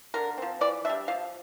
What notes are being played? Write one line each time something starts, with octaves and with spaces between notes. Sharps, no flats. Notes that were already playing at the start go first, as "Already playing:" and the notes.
D3 A#4
F3 C4
E3 D5
G3 D4 E5
F3 F5